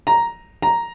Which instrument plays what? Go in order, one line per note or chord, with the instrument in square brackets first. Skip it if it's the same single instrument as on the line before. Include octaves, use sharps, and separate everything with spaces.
[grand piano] A#5
A#5